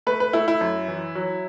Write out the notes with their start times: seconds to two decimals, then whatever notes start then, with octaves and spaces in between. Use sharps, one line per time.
0.07 A3 B4
0.20 B4
0.33 A3 E4
0.48 E4
0.61 F#2
0.88 E3
1.15 F#3